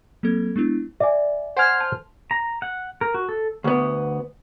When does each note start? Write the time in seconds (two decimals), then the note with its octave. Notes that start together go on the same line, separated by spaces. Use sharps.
0.23 F#3 A#3 C4 A4 G#6
0.56 G#3 B3 D4 E4
1.00 D5 E5 G#5
1.57 C5 F#5 G#5 F6 G#6
1.80 A5
2.31 A#5
2.62 F#5
3.01 A#4
3.14 F#4
3.29 A4
3.64 D2 B3